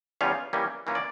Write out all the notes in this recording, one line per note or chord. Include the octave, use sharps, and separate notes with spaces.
E2 C#3 G3 C#4 F4 F5
E3 G3 A#3 C#4
E3 A#3 C#4 F4
D5